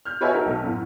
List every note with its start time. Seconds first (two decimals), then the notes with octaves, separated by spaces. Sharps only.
0.05 F6 G6
0.21 F#4 B4 C#5 D#5 E5 G#5
0.34 D#4 F#4 A4 A#4 D#5
0.46 B1 A3
0.63 F#2 A2 B3